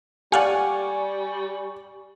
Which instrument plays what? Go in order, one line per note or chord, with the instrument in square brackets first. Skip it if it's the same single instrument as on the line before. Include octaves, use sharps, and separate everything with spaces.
[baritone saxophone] G3 [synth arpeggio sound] G4 F5 F#5 [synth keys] D5 C#6 [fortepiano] G#5